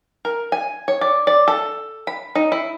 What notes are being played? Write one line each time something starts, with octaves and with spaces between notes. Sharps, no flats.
A#4
G#5
C#5
D5
D5
A4
B5
D#4
E4